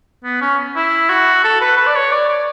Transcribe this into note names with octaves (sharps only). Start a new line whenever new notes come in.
B3
C#4
E4
F#4
A4
B4
B4
D5
C#5
D5
D5